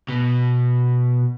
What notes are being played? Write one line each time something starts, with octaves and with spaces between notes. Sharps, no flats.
B2